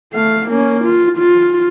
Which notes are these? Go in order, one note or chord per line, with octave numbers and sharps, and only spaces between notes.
A3 F5
A#3 C#4
F4
F4